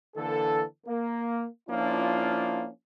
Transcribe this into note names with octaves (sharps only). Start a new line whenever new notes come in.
D3 E3 A#3 A4
A#3
F3 A#3 C#4 D4 E4 F4